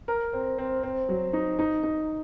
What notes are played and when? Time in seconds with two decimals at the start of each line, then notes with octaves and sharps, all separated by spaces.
0.08 A#4
0.33 C4
0.58 C4
0.83 C4
1.09 F#3
1.33 D#4
1.59 D#4
1.83 D#4